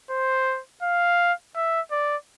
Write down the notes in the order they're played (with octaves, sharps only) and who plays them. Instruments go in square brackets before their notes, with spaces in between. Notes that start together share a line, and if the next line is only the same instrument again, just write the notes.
[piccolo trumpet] C5
F5
E5
D5